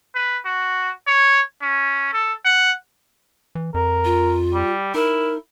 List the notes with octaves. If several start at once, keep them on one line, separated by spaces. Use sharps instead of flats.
B4
F#4
C#5
C#4
A4
F#5
E3
F2 A#4
F4
G3
D#4 E4 A#4